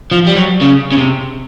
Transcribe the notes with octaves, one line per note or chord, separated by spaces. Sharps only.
F3
G3
F#3
C#3
C#3
C3